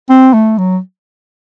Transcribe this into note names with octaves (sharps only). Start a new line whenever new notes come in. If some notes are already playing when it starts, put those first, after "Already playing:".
C4
A3
F#3